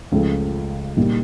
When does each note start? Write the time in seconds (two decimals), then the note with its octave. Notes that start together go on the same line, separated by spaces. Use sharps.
0.11 C#2 C#3 F3 A3
0.97 A#2 G3 A#3 D#4